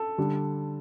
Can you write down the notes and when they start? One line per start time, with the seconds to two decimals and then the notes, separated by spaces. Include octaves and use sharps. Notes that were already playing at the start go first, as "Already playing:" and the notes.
Already playing: A4
0.18 D3 G3